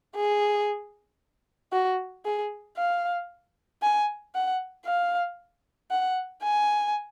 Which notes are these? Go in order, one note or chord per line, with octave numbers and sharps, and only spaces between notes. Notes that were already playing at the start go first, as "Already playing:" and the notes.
G#4
F#4
G#4
F5
G#5
F#5
F5
F#5
G#5